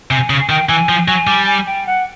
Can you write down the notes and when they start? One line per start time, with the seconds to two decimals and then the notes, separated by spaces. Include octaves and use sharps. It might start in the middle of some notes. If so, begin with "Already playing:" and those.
0.11 C3 G#5
0.30 C#3
0.40 G#5
0.49 D#3 G5
0.69 E3 G#5
0.89 F3
1.07 F#3 G#5
1.27 G3
1.46 G#5
1.67 G5
1.87 F#5